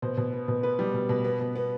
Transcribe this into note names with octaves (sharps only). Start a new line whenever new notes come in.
B2 C5
B2
B3
B2
B3 B4
G3
B2
B2
B3
B2
B3